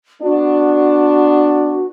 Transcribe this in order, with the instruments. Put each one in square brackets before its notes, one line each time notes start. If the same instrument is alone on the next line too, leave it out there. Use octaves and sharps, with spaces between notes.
[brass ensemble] B3 D4 [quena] F#4